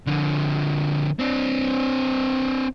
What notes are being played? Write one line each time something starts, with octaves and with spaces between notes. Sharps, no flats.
D3 F3
C4 D4